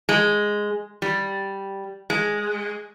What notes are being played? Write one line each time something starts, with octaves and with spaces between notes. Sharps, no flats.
G#3
G3
G#3